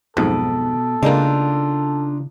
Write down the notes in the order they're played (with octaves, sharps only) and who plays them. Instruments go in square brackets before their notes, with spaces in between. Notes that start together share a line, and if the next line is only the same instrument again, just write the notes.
[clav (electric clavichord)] B1 F2 G#2 [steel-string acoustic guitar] B2 [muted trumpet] A4
[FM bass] C#3 [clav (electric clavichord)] G#3 A#3 [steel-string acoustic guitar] D4 D#4 F4